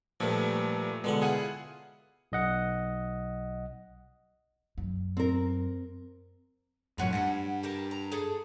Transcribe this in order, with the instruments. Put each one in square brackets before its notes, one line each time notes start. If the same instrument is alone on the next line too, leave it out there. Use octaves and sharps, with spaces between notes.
[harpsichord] G2 F3 [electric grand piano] A#2 A3
[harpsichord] B2 D3 F#5 [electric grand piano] G#3
[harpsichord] E4 F4 [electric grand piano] G#4 F#5 D#7
[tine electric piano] B1 D#5 F#5
[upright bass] F#2
[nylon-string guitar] C4 A#4
[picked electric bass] F#2 A2 F#3 [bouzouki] F4 F#4 C#5
[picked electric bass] G2 [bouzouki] F#5 G#5
[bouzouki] G4 A#4 A5
A#5
G#4 A4